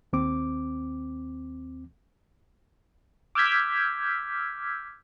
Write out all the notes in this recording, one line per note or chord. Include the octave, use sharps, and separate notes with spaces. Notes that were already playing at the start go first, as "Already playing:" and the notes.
D#2 C4 D6
D6 E6 F6 G6 G#6 B6